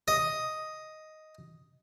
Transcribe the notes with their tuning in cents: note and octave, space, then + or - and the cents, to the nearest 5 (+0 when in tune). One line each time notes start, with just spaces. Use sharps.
D#5 +5